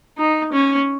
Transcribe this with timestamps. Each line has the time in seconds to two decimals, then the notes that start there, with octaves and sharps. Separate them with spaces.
0.17 D#4
0.53 C#4